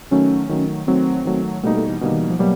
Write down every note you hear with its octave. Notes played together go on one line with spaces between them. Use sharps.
D#3 F#3 A3 C#4
D#3 F#3 A3
D#3 F#3 A3 C4
D#3 F#3 A3
B2 G3 A3 A#3 D#4
A3
E3
B2 D3 G3 A#3 D#4
D#3
E3
F3
B2 F#3 G3 A#3